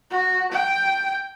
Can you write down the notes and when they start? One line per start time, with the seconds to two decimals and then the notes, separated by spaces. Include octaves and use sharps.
0.10 F#4
0.52 G5